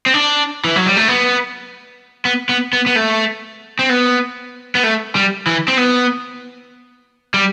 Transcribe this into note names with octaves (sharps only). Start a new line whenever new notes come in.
C4
D4
E3
F#3
G3
A3
B3
B3
B3
B3
B3
A3
C4
B3
B3
A3
G3
E3
C4
B3
G3